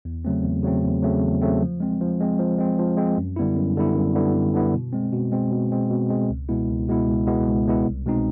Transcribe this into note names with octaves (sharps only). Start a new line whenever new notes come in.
E2
C#3 F#3 A3 C4
E2
C#3 F#3 A3 C4
E2
C#3 F#3 A3 C4
E2
C#3 F#3 A3 C4
F3
G#3 C4
F3
G#3 C4
F3
G#3 C4
F3
G#3 C4
F#2
D3 G3 B3 E4
F#2
D3 G3 B3 E4
F#2
D3 G3 B3 E4
F#2
D3 G3 B3 E4
B2
G#3 C4
B2
G#3 C4
B2
G#3 C4
B2
G#3 C4
C#2
B2 G#3 B3 E4
C#2
B2 G#3 B3 E4
C#2
B2 G#3 B3 E4
C#2
B2 G#3 B3 E4
C2
B2 G#3 C4 D#4